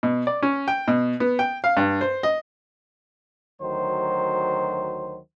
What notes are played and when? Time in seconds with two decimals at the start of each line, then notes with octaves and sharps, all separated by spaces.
0.03 B2
0.27 D5
0.43 C#4
0.68 G5
0.88 B2
1.20 B3
1.39 G5
1.64 F5
1.77 G2
2.01 C5
2.23 D#5
3.60 D2 D#3 F#3 C5